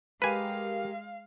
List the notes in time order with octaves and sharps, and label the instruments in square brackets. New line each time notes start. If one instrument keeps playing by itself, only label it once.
[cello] G#3 [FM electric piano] G4 A#4 [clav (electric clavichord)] B4 G#5 [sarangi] F5